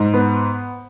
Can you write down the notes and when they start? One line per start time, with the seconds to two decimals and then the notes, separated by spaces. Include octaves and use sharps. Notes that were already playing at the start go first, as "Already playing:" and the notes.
Already playing: G#2
0.14 B3